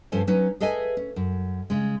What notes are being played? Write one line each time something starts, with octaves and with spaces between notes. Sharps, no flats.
G2 F3 C#4 A4 C5 G#5
F#3 C#4 D#4 B4
G#4 A4 B4 D#5 E5 G#5
C#4
F#2
C#3 G#3